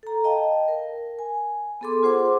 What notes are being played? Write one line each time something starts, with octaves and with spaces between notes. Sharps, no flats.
A4 A#5
D#5 F5 G5 A5
A#4
G#5
B3 G#4 A4 C6 D6
F4 G#4 C5 F#5 C6 D6